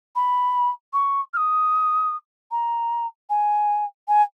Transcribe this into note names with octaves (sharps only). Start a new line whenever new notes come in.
B5
C#6
F6
D#6
A#5
G#5
G#5